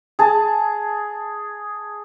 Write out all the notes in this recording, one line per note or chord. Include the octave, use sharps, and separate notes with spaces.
G#4 A5